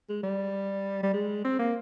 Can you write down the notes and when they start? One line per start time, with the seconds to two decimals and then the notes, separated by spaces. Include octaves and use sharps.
0.09 G#3
0.23 G3
1.03 G3
1.14 G#3
1.45 C4
1.59 A#3